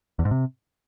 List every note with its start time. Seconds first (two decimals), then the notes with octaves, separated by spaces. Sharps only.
0.19 E2
0.25 G#2
0.31 C3